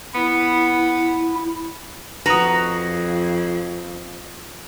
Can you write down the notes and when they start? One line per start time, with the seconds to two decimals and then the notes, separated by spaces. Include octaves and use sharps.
0.15 B3 E4
2.26 F2 F#4 B4 A#5 D#6 A#6